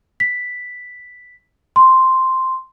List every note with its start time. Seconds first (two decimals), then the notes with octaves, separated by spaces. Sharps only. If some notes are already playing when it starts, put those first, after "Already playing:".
0.20 B6
1.76 C6